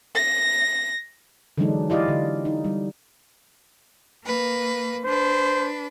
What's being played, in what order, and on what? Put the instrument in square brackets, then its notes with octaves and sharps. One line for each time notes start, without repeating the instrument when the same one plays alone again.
[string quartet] A#6
[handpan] D3 E3 F#3 G#3 D4 D#4
E4 F4 G4 D5 D#5 F5
D3
D#4
G3
[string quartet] A#3 B4
[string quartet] D4 B4 [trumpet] C5